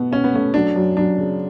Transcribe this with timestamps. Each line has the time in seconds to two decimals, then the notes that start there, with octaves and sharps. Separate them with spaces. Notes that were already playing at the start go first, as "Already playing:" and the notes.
Already playing: B2 A3 B3
0.11 B2 C#4
0.24 B3
0.33 A3 C#4
0.54 F#3 D4
0.76 F#2
0.97 F#2 D4
1.18 C#3